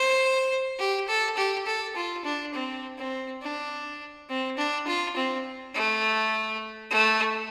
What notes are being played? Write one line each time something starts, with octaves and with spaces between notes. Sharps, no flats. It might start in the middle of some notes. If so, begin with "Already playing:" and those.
Already playing: C5
G4
A4
G4
A4
F4
D4
C4
C4
D4
C4
D4
F4
C4
A3
A3